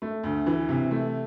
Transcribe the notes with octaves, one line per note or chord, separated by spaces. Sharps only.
A3
D2
E3
C3
A3